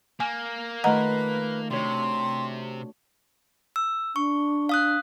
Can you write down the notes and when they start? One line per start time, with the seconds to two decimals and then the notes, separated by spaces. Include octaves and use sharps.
0.20 A#3 G#5
0.84 D#3 A3 F4 B4 D#5 F#5 A#5
1.71 C3 D4 F#4 C#5 C6
3.76 E6
4.16 D4 C#6
4.69 F5 D#6 F#6